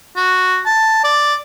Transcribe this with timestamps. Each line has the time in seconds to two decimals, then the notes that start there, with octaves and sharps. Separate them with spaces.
0.17 F#4
0.66 A5
1.04 D5